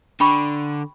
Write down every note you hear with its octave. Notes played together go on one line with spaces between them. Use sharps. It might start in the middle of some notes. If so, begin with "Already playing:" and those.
D3 G5 B5 C#6